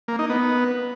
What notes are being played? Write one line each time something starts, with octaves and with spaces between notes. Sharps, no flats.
A#3
D#4
B3